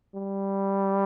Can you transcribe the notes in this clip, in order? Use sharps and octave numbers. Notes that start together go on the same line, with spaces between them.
G3